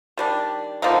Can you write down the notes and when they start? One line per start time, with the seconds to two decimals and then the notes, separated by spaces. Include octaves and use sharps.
0.18 D#3 G3 D4
0.82 D3 F3 A#3 D#4